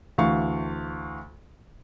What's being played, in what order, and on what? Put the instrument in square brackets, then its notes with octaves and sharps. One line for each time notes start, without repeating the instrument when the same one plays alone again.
[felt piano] D2 E3 F5 C#6